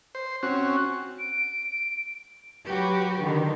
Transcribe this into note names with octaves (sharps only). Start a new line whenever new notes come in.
C5
C4 C#4 F#4
D7
F#3 F#4 G4 B4
D3 D#3